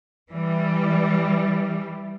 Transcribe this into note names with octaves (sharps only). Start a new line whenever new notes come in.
E3 G3